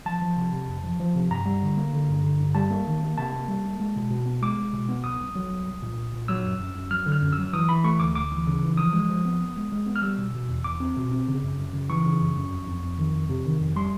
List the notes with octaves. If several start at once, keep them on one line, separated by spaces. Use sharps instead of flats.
F3 A5
F3
C3
C3
F2
F3
F3
C3
G2 A#5
G3
D3
A#3
D3
G2
D3
G2
G3 A5
A#3
D#3
A#3
C3 A5
A#3
G3
A#3
G#3
B2
B2
B3
G#3 D6
G#3
B2
B3
C2 D#6
C2
F#3
C2
C2
A#2
C2
A#2
F#3 E6
F#2
F#2
F#2
F#3 F6
D3
F6
F#2
E6
F#3
E3 D#6
E3 B5
A3 C#6
D2 D6
D2 D6
E3
C#3
E3
F3 D#6
G#3
F3
B3
B3
G#3
G#3
B3
F6
G3 E6
B2
B2
E2
E2 D6
C4
B2
C4
C#3
F#2
F#2
C#3
E3 C#6
C#3
F#2
F#2
F2
F2
F2
D#3
F2
C3
D#3
F2
G3 C6